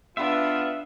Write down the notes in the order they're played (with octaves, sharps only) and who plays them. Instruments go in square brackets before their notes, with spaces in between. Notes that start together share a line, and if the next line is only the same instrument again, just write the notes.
[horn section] B3 F4 B4 [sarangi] D4 [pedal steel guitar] E5